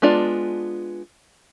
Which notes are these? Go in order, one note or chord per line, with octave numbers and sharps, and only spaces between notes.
G#3 B3 D4 F4 D5